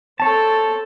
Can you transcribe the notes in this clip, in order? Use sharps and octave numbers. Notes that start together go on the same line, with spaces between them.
C4 A4 C#5 A5